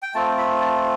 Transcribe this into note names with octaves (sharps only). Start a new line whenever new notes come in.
G5
A3 C4 F4 A5
B5
A5